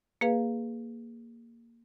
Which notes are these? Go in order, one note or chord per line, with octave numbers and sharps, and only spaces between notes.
A#3 G#4 B4 F5